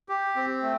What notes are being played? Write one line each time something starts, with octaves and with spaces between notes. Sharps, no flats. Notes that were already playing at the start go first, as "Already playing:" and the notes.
G4
C4
A3